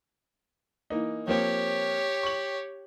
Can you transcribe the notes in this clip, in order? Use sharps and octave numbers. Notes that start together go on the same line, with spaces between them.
E3 A#3 D#4
F3 A#3 C4 G4 C#5
C#6 F#7